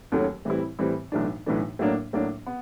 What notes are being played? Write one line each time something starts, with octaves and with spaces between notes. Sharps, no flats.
D#2 C#3 F#3 A3 C#4
A2 E3 G3 C4 E4
A2 E3 G3 C4 E4
B1 A2 E3 A3 D4
B1 A2 E3 A3 D4
A2 F#3 A#3 D4
A2 F#3 A#3 D4
B3